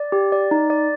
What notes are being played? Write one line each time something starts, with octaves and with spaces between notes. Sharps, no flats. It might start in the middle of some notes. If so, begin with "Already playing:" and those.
Already playing: D5
G4
D5
D#4
D5